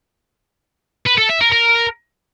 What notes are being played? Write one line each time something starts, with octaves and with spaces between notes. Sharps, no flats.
B4
A4
E5
A#4
A#4